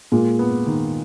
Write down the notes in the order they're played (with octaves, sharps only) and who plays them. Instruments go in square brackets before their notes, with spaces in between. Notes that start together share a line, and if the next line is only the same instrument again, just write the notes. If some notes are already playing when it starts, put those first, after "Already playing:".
[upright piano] A#2 [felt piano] G#3
[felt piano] B3
D#3